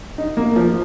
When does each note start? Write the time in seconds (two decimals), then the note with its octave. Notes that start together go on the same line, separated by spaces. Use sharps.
0.18 D#4
0.37 A#3
0.56 F3